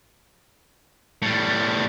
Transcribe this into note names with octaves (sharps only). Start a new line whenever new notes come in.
A2 G3